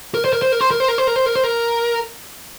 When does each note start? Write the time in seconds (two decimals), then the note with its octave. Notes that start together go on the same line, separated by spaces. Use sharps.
0.14 A#4
0.25 C5
0.33 A#4
0.42 C5
0.52 A#4
0.61 C5
0.71 A#4
0.80 C5
0.88 A#4
0.98 C5
1.07 A#4
1.16 C5
1.26 A#4
1.35 C5
1.44 A#4